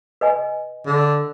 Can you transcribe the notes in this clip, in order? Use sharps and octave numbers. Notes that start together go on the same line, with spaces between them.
B4 D#5 G#5
D3